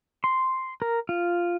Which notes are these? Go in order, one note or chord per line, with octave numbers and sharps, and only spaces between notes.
C6
A#4
F4